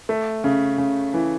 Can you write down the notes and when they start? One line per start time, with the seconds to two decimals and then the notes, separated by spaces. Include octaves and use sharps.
0.09 A3
0.44 C#3
0.78 C#3
1.14 E3